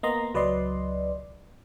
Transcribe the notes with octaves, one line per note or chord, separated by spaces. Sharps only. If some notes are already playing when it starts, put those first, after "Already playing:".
A#3 B3 D#5 A#5 C6
C#2 F#3 B4 D5 D#5 C6